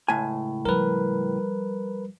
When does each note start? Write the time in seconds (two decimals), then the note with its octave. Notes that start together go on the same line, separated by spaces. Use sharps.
0.08 C#2 A2 G#5
0.65 F3 G3 A#4 B4